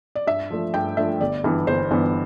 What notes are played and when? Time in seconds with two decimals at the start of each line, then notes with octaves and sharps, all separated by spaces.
0.15 D5
0.27 G2 E5
0.51 F3 A3 D4
0.74 G2 G5
0.97 F3 A3 D4 E5
1.21 G1 D5
1.44 G2 E3 B3
1.67 G1 C5
1.91 G2 E3 B3